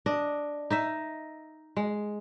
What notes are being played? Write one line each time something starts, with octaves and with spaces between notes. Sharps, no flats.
D4 D#5
D#4 D#5 E5
G#3